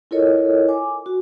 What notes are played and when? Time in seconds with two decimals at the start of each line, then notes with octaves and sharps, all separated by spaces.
0.11 E4 F4 A4 A#4 C#5 D#5
0.68 G#5 D6
1.06 F#4